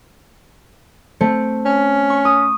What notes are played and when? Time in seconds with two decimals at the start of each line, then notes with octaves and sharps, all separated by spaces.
1.21 A3 C4 C#7
1.65 C#4
2.10 C#6
2.25 D#6